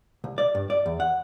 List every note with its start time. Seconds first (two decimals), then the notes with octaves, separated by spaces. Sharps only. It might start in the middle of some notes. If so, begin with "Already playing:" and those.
0.24 C2
0.38 D5
0.55 G2
0.70 D5
0.86 E2
1.00 F#5